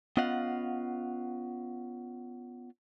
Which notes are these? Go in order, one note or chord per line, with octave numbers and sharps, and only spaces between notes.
B3 C#4 F4 D#5 F5 F#5